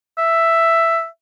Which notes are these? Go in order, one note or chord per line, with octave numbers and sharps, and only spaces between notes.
E5